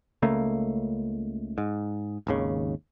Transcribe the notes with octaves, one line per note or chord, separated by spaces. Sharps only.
C#2 C#3 A3 A#3
G#2
G#1 D#2 C#3